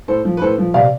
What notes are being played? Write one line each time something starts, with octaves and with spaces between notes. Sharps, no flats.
A2 A4 C5
F3
B4
A2 A4 C5
F3
C3 D5 F5